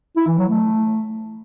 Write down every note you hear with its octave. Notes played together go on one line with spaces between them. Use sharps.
E4
E3
F#3
A3